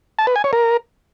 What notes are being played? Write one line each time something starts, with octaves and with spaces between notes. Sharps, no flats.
A5
B4
G#5
C#5
A#4